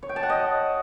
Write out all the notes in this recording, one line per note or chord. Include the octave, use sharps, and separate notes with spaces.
C#5
G5
A5
F#5
D#5